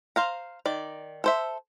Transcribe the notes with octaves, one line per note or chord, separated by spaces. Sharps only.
C5 F5 A#5
D#3 D5
A4 C5 E5